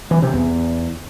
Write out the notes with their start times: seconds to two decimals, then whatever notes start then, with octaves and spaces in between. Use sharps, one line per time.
0.11 E3
0.22 C3
0.34 E2